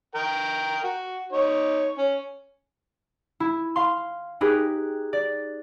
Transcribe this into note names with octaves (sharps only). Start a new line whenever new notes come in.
A#4 G5
F#4
D#4 C#5
C#4
E4
F5 C6
D#4 G4 G#4 A#4 B4
D5